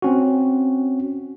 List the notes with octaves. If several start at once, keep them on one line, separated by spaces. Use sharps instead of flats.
C4 C#4 F#4